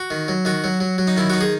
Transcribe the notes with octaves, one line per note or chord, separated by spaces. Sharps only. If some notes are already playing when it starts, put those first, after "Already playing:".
Already playing: F#4
D#3
F#3
D#3 F#4
F#3
F#3
F#3
D#4
D#3 E4
D#4 F#4
G#4